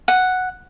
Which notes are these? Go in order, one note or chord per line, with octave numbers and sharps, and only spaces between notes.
F#5